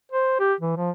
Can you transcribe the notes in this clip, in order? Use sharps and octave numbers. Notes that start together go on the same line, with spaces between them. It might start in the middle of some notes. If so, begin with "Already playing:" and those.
C5
G4
E3
F3